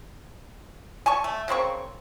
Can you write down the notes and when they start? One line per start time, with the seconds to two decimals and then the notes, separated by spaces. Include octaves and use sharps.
1.06 G#5 A5 C#6
1.24 A3
1.48 C#3 A#3 C4 C#6